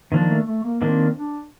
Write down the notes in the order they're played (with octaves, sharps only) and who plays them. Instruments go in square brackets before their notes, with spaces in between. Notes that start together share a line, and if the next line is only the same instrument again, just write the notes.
[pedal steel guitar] D#3 A#3 D4 [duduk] F3
[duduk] A3
A3
A#3
[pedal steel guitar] D#3 A#3 D4 [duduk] C4
[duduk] D4